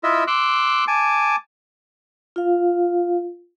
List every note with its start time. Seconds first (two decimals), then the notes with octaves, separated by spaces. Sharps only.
0.03 E4 F4 D#5 E5
0.27 C6 D6 E6 F#6
0.87 G#5 A5 D6
2.36 F4 F5